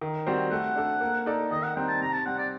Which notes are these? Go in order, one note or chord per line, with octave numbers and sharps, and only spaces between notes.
D#3
G3 C4 F#4 C5
A3 F#5
D4 A4 D5
A#3
D#4 A4 D5
D#3 D#5
F#5
G3 C4 D#4 G5
A5
C3 A#5
A5
G3 C4 F#5
D5